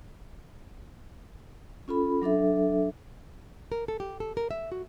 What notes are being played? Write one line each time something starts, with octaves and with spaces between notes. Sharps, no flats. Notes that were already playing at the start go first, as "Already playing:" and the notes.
C#4 F4 A4 B5
F#3 D4 A4 E5
A#4
A4
G4
A4
A#4
E5
F#4